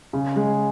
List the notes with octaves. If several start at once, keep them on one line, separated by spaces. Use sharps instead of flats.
C#3
G#3